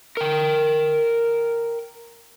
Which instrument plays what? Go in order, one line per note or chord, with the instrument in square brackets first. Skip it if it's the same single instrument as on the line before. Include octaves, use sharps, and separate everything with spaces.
[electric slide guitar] A#4 G5